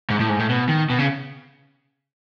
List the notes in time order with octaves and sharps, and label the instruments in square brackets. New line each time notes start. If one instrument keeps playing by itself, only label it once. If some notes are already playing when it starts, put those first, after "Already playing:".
[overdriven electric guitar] G#2
A2
G#2
A2
B2
D#3
B2
C#3